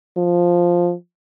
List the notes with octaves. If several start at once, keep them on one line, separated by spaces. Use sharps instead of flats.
F3